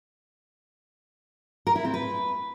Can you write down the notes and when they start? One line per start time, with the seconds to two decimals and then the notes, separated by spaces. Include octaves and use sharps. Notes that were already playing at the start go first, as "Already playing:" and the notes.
1.67 A#4
1.76 E4
1.85 C4
1.94 B4